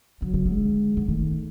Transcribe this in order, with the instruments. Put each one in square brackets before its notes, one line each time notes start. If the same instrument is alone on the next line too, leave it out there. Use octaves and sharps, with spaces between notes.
[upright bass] D3 [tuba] F#3
[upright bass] C#3
D3
[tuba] G#3
[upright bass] D3
[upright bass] D#3 [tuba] A3